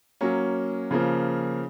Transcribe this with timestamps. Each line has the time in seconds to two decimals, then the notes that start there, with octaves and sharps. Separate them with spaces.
0.21 F#3 A#3 C#4
0.91 C#3 F3 A#3